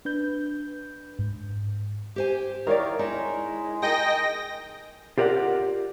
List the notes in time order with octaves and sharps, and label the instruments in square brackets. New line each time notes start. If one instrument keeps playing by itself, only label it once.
[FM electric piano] D4 B4 G6
G#2
[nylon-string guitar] G4 C5 G#5
[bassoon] D#3 [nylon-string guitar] E4 F5 [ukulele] A#4 C#5 D5
[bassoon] G#3 [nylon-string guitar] D#4 E4
[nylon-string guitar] D#4 [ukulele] G#4 A#4 [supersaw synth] D#5 G5 A#6
[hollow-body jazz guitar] F4 G4 A#4 C#5 D5 F#5